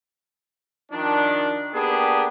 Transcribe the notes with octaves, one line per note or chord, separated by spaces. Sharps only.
D#3 F3 D4
A#3 B3 D4 G4 G#4